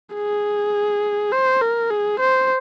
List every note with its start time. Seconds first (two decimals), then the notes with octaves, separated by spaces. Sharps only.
0.15 G#4
1.32 C5
1.61 A#4
1.90 G#4
2.19 C5